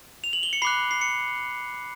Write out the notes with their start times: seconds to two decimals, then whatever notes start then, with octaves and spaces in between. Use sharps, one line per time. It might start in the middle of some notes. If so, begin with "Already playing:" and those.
0.24 F7
0.33 F#7
0.43 G7
0.53 C#7
0.62 B5 D6 F#6 C7
0.91 C7
1.01 C#7